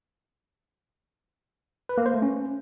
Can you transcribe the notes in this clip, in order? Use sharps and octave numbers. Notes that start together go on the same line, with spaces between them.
B4
A#3
C5
A3
C#4